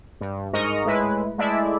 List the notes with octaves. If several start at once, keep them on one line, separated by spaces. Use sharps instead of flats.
G2
G#2 A#4 D#5 A#5 C#6
A2 G#3 E4 B4
G#3 A3 E4 D5 E5